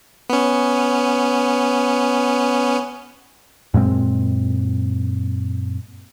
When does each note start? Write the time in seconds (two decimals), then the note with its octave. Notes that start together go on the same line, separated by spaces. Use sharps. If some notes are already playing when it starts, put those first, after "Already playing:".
0.30 B3 C#4
3.74 F#2 A#2 G#3 C4